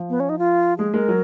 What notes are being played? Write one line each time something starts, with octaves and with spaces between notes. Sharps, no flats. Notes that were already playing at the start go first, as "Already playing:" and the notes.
Already playing: F3
B3
C#4
D#4
F4
G#3 G#4
G#3 A#4
F#3